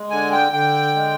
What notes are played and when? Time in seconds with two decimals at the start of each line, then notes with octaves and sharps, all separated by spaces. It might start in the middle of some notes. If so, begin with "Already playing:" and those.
Already playing: G#3
0.10 D3 G#5
0.32 G5
0.52 D3 G5
0.95 G#3